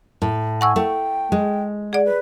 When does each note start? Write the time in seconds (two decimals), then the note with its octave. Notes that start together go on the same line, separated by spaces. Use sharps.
0.22 A2
0.61 F#5 G#5 C#6 E6
0.76 A3 G5
1.32 G#3
1.93 G#4 D5 F#5
2.05 B4